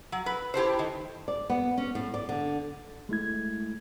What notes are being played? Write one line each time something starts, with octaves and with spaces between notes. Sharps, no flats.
F#3
B4
E4 G4 A4 C5
D#3
D5
B3
C#4
A2
D5
D3
G#3 A3 E4 G#6